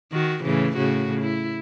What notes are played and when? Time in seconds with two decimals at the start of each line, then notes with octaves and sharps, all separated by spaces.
0.13 D#3 F#4
0.44 A2 C#3 E3
0.77 A2 C#3 F#4
1.22 E4